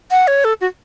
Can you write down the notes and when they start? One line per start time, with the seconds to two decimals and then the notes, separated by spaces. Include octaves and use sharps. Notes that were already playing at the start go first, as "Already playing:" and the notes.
0.11 F#5
0.27 C#5
0.44 A4
0.61 F#4